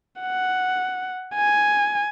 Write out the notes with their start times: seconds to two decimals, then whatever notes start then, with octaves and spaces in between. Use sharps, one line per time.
0.21 F#5
1.35 G#5